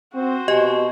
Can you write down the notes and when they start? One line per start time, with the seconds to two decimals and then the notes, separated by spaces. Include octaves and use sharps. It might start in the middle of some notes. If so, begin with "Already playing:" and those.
0.15 C4 F#4 C5
0.48 B2 G4 D#5 G#5